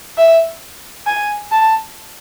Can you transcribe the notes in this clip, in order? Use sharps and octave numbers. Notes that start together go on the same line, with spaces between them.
E5
G#5
A5